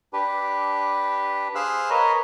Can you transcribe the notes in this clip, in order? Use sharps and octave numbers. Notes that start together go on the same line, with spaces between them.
D4 G4 B4
G#4 C5 F5 E6 F#6
A#4 B4 C#5 D#5